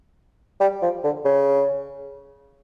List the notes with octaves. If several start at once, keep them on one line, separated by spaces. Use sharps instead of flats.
G3
F3
D3
C#3